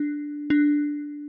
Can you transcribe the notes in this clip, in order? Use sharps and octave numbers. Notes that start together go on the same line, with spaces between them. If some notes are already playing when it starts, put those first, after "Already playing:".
Already playing: D4
D4